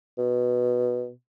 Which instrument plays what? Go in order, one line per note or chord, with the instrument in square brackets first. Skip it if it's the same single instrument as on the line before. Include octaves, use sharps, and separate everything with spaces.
[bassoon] B2